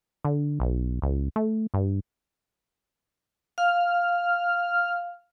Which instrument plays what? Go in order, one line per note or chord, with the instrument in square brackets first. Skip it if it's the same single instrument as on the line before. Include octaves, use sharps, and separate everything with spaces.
[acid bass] D3
B1
C#2
A3
G2
[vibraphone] F5 [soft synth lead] F6